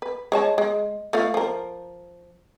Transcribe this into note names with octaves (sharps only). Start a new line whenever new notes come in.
B4
G#3 C#5 A5
G#3
A3 F4 F5
F3 A#4